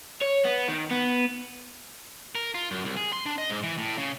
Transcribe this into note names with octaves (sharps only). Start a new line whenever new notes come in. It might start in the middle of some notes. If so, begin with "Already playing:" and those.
C#5
B3
D#3
B3
A#4
F4
F#2
C2
G#4
C6
D4
D#5
G#2
E3
A2
C#3